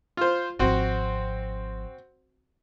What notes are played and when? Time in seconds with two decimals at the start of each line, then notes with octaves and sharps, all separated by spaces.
0.17 F4 C5
0.59 G#1 F3 C4 F#4